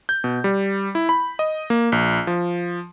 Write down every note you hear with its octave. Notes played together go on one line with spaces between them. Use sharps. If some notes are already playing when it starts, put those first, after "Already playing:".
G6
B2
G3
E4
B5
D#5
A#3
A#1
F3